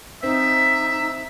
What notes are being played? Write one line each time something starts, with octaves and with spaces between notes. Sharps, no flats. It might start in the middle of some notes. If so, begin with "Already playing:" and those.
C4 D#4 E5